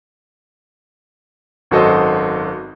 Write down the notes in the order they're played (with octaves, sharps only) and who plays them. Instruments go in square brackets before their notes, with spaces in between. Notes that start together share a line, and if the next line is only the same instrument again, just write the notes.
[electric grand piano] G#1 F#2 F#4 A4 C5 D#5